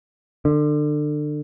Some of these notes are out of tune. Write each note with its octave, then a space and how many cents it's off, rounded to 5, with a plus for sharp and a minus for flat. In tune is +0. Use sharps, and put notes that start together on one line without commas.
D3 +30